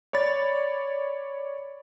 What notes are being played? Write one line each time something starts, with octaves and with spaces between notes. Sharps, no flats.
C#5 D5 B5 A6